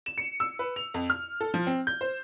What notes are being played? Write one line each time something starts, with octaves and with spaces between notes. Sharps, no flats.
E7
C#7
E6
B4
F7
F2
F6
A4
F3
C4
G6
C5